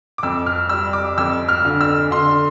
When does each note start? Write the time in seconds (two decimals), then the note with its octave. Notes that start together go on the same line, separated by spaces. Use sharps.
0.18 D6
0.23 F2 E6
0.46 F6
0.69 G3 E6
0.93 D6
1.18 F2 E6
1.49 F6
1.65 D3
1.81 E6
2.11 D3 C6